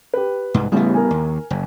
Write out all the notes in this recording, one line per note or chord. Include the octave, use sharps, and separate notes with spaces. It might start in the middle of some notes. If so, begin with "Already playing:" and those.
G4 B4
C2 G#2
A1 A2 C#3 G3 B3
A#4 G#5
D#2
F#1